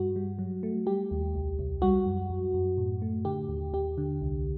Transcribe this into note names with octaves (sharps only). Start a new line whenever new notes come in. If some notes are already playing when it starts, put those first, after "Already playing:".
Already playing: G2 G3 F#4
G3
F#3
A3
G3 G4
D#2
C2
C2
G3 F#4
F#2
F#2
F#2
A2
A3
D3 G4
D#2
D#2 G4
D3
C2